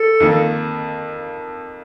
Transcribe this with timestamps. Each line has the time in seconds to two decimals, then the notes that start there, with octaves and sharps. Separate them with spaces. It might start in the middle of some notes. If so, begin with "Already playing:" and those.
Already playing: A4
0.20 F2 D#3 A#3